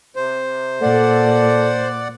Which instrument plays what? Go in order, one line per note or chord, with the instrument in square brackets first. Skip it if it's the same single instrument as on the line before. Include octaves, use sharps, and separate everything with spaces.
[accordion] C3 [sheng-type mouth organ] C5
[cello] A#2 [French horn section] A4 [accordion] D5 F#5